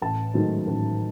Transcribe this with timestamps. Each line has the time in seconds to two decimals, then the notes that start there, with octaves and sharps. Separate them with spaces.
0.02 A1 A5
0.34 G#2 D#3 F#3 A3
0.67 A1